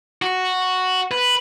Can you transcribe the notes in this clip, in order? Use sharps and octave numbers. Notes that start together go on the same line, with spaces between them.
F#4
B4